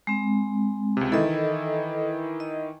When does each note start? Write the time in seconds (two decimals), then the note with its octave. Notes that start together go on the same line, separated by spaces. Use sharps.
0.07 G#3 C4
0.97 C#2 C3
1.12 D#3 E3 E4 A4 D#5
2.40 D#5